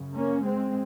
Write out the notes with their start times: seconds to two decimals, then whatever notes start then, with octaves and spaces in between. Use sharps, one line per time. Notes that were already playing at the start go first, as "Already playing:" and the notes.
Already playing: F#2 C#3
0.15 A#3 C#4
0.45 G#3 C4